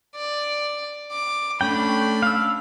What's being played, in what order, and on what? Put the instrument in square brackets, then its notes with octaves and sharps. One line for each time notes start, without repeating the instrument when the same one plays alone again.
[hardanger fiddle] D5
D6
[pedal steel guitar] A3 C#4 G5 [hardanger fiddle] D4 B5
[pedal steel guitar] F5 E6